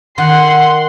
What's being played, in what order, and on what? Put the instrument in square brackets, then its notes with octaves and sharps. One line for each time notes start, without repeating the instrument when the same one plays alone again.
[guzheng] D#3 [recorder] F#5 [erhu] C6